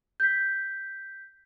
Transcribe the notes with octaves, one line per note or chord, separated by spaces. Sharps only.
G6 B6